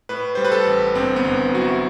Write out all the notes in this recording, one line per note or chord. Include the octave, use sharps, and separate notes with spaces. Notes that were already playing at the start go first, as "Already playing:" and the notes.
A2 B4
G3 C5
B4
A4
A1
G1 C4
B3
G1
F#3 F#4
E4